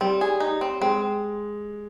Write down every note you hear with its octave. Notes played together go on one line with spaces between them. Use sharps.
G3 C4
G#4
D#4
C4
G#3 C4